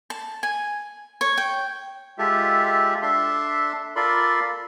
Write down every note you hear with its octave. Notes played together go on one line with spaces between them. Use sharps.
A5
G#5
C#5
G5
G#3 F4 G4 A4 E5
D4 A4 E5 C6
F4 A4 A#4 D5 B5 C6